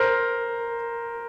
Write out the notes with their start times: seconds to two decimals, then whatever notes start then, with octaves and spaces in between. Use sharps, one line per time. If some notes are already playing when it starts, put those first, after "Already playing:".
Already playing: A#4 C5